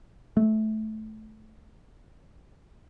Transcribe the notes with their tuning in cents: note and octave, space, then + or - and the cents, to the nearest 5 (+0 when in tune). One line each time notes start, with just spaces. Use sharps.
A3 -15